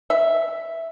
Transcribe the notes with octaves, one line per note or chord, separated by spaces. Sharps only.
E5